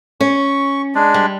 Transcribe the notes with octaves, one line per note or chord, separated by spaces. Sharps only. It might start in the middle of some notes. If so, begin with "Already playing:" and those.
C#4 C#6
G#3 D4
G3